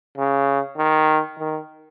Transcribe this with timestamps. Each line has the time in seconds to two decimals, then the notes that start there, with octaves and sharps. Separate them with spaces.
0.18 C#3
0.77 D#3
1.39 D#3